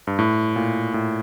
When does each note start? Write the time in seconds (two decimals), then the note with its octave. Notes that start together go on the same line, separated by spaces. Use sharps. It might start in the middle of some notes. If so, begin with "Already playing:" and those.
0.07 G2
0.19 A2
0.56 A#2
0.94 A2